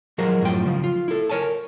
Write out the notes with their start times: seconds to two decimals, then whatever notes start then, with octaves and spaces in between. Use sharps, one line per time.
0.18 F3 F#3 G#3 A#4 C5
0.42 F#2 A2 F3 G5
0.65 C#3 F3
0.84 F4
1.08 E4 A4
1.30 A#4 C#5 G#5 A5